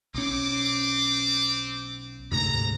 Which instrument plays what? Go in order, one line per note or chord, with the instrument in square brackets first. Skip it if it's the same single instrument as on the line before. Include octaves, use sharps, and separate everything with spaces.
[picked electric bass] B1 C#4 [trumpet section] C4 D6
[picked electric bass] D2 G#2 C3 [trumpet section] A#5